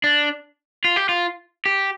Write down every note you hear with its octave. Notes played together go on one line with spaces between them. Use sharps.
D4
F4
G4
F4
G4